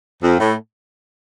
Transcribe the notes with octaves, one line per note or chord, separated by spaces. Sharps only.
F2
A2